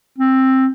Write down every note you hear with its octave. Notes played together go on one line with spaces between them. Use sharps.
C4